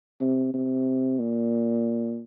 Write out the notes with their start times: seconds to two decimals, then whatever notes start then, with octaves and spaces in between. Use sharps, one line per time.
0.21 C3
0.53 C3
1.19 A#2